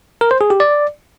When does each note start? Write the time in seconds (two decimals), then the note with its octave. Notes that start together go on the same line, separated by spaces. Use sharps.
0.21 A#4
0.31 C5
0.41 G#4
0.50 G4
0.60 D5